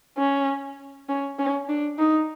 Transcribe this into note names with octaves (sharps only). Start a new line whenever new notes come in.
C#4
C#4
C#4
D4
D#4